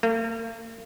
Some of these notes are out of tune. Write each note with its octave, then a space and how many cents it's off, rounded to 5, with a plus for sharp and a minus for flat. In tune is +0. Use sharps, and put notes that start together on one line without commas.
A#3 -45